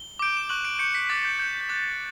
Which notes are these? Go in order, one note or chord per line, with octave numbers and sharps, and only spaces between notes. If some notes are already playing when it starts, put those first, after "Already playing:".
Already playing: G7
D6 G6 D7
E7
C#6 F#6 F#7
D7
C#6 G6 C#7
B6
D6 F#6 A6
G6
D6 F#6 G6
G6
D6 F#6 A6